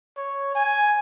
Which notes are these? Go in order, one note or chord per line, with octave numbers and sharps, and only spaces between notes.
C#5
G#5